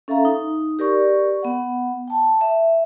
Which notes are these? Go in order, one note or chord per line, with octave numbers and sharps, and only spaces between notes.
C#4 A4 E5 F5 A#5
D#4
G4 A#4 D5 C#6
B3 F#5
G5 A5
E5